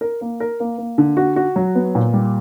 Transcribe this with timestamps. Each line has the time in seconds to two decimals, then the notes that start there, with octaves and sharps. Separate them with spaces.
0.01 A#4
0.21 A#3
0.40 A#4
0.60 A#3
0.78 A#3
0.98 D3
1.17 F#4
1.36 F#4
1.56 F#3
1.75 B3
1.95 A#2
2.13 G3